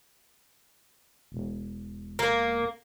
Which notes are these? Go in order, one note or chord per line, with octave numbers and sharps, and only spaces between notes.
E1
A#3